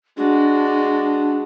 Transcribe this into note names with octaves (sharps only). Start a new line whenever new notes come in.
G#3 D4 F#4